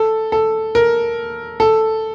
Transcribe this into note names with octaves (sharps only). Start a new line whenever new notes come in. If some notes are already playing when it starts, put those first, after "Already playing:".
Already playing: A4
A4
A#4
A4